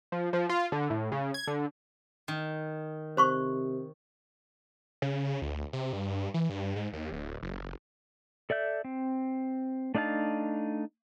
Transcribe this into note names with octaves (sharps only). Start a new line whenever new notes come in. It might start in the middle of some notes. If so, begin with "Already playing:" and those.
F3
F3
F4
D3
A2
C#3
G#6
D3
D#3
C3 C5 C6 C#6
C#3
D2
C3
G2
E3
G2
G#2
D#2
D1
F#1
A4 D5 E5 G6
C4
A3 D4 D#4 F5 A5